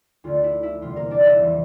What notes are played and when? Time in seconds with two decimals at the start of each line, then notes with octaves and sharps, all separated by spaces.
0.24 D2 D3 A3 F4
0.44 E4
0.63 E4
0.81 E2 C3 G3 F4
0.96 A#3 A#4
1.11 D4 D5
1.25 E4 E5
1.40 E2 C3 E3